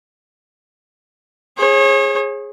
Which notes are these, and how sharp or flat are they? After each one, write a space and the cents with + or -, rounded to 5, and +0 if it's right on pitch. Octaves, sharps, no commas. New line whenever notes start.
G#4 +0 C#5 -40